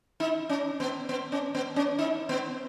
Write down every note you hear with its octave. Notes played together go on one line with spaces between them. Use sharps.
D#4
C#4
B3
B3
C#4
B3
C#4
D#4
B3